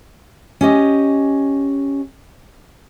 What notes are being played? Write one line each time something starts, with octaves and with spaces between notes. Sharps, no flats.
C#4 G4 D#5